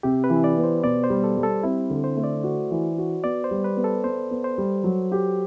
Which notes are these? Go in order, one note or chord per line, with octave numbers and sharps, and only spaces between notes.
C3 G4
B4
E3
D5
B3
C5
B2 D5
C5
G3
A4
G3
A4
C4 E4
D3
C5
A3
D5
F#4
E3
F#4
B3 D5
C5
G3
B4
B3
A4
B3 C5
B3
C5
G3
F#3
G4